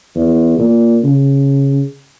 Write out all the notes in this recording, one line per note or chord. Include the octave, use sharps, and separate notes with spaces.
E2
A#2
C#3